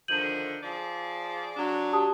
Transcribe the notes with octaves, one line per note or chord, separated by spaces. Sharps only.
D3 D#3 F3 G6 D#7 F#7
F3 G#4 D5
F#3 D4
G4 A5 D#6